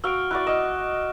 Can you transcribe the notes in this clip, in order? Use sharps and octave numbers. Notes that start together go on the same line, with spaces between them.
F#4 F5 E6 F6 D7
E4 F#4 D5 F#6
D#5 F6 E7